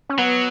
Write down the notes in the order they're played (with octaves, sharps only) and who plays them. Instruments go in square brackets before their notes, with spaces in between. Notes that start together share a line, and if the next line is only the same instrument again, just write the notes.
[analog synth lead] C#4
[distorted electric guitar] F#3 [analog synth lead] B3